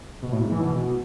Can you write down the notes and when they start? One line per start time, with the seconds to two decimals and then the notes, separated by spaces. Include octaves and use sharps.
0.23 B2
0.32 A2
0.42 G#2
0.51 E3
0.61 B2